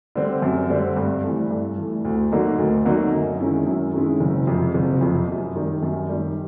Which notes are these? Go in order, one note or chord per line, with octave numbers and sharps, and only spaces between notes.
D3 G3 C4
F#2
D3 G3 C4
G2
E3 A3
G2
E3 A3
D2
D3 F#3 A#3 D#4
D2
D3 F#3 A#3 D#4
F#2
D#3 G#3 C#4 E4
F#2
D#3 G#3 C#4 E4
F#1
F2 C3
F#1
F2 C3
F#2
D#3 G3
F#2
D#3 G3